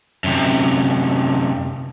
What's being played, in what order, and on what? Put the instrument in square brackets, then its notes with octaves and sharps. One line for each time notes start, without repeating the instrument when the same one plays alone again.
[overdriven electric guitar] F#2 C3